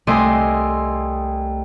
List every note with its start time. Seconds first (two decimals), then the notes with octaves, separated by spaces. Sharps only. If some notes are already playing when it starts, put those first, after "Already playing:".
0.07 C2 A3 D#5 G#5 C6 D6